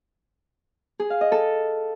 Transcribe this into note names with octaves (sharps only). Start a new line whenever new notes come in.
G#4
F5
D#5
A4